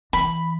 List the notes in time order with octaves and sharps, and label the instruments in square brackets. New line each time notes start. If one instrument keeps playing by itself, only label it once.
[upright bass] E3 [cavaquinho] B5